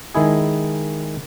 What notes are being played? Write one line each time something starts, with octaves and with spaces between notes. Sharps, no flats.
D#3 G#3 E4 G#4